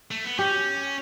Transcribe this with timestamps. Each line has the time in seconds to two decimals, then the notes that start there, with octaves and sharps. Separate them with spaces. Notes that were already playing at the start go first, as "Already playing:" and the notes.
0.11 A3
0.24 B3
0.39 C#4 G4